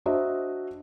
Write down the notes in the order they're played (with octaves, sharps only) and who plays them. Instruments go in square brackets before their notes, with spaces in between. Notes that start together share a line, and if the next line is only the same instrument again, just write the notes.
[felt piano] D4 F#4 C5 D#5 E5